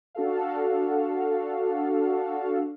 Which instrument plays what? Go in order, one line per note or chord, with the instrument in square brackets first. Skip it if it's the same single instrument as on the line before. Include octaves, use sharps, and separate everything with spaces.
[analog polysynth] D4 F#4 A4 F5